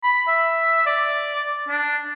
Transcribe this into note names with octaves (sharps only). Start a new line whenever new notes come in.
B5
E5
D5
D4